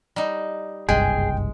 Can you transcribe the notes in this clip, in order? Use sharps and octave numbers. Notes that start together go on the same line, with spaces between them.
G3 D#4
F#1 C2 G2 G#3 G#4 G5